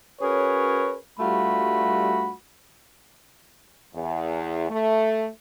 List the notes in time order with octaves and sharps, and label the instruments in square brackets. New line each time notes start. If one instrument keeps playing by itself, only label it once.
[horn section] C#4 F#4 G#4 A#4 B4 C#5
G2 G3 A3 F4 F#4 B5
[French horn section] E2
A3